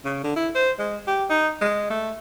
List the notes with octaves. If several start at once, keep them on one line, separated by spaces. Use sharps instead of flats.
C#3
D3
E4
C5
G#3
G4
D#4
G#3
A3